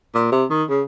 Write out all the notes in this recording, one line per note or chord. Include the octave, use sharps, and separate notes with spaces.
A#2
C3
D#3
C#3